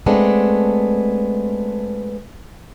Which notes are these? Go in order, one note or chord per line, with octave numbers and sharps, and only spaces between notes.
G#3 A3 B3 C4 D4